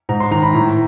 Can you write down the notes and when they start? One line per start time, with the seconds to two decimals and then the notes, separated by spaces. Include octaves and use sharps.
0.09 G#2 A#5
0.20 C6
0.31 D#3 A#5
0.43 B5
0.54 A2